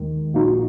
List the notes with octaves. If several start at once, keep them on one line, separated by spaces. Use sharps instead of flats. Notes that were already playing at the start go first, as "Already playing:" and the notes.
Already playing: D#2 D#3 G#3
A#1 A#2 A#3 D#4 F#4